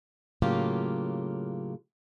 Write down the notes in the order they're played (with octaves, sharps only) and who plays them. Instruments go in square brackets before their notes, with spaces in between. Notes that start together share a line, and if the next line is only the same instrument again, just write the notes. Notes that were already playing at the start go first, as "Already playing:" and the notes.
[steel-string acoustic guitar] A2 C#3 F#3 A#3 F4 G4